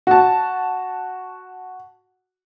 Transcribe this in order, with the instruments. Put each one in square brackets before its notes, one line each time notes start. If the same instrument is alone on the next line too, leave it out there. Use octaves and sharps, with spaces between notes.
[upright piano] F#4 A5